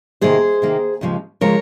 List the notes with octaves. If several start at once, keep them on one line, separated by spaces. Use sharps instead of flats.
C3 D#3 A#3 G#4 C5
C3 D#3 A#3
D#2 C#3 F3 G#3
C#3 F3 G#3 A#4 C#5